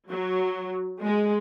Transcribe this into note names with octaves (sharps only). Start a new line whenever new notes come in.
F#3
G#3